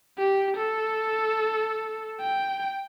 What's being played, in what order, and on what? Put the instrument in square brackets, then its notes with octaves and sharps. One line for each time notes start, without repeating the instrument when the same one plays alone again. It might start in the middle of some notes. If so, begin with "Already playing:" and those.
[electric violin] G4
A4
G5